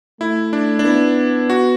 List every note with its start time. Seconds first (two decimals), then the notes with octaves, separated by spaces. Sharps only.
0.21 A3 E4
0.53 D4
0.79 D4
0.85 B3 E4
1.50 F#4